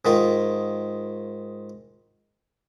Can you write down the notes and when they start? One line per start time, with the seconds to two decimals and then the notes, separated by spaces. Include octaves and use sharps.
0.05 G#2 D#3 F4